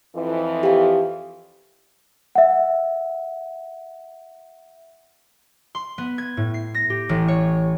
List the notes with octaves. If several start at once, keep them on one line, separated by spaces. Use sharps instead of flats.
F2 E3
G4 F5
E5 F#5
C6
B3
G#6
A2
C7
A#6
G4
A1
C#5